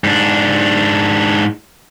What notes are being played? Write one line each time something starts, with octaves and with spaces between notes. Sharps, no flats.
G#2 D4